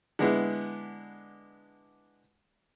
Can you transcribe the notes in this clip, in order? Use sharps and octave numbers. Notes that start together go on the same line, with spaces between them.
D3 G#3 B3 E4